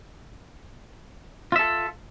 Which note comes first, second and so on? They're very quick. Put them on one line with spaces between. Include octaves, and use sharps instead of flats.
F4 E5 A4